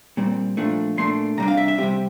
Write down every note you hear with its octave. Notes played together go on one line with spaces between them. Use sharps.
A#2 G3 C4
A#2 F3 A3 D4
A#2 A3 D4 C6
C3 G3 D4 A#5
F5
E5
E5
C3 G3 C4 G4